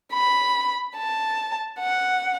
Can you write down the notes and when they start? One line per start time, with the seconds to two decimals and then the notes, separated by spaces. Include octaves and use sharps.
0.13 B5
0.97 A5
1.80 F#5